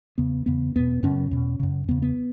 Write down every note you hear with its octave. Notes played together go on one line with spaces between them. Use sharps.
E2 C#3 B3
E2 C#3 B3
E2 B2 B3
F#2 C#3 C#4
E2 B2
F#2 C#3
E2 C#3 B3
B3